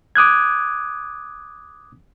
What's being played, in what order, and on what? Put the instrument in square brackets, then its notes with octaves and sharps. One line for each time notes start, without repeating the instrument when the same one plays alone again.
[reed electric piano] D6 D#6 F#6 G#6